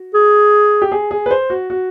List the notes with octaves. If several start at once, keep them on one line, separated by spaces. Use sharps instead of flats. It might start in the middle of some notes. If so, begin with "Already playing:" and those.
Already playing: F#4
G#4
G4
G#4
G#4
B4
C5
F#4
F#4